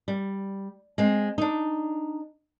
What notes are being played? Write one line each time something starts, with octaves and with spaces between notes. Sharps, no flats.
G3
G#3 C4
D4 D#4